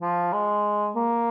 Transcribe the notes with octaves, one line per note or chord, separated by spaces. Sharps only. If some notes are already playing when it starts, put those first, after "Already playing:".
F3
G#3
A#3